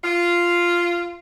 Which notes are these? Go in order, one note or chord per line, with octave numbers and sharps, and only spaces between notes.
F4